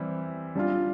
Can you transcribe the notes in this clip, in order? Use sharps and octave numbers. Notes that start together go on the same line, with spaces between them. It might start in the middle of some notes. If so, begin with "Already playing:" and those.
Already playing: E3 G3 C4 E4
G3 D4 F4